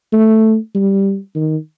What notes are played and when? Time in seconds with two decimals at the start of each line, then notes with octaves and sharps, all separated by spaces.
0.13 A3
0.75 G3
1.35 D#3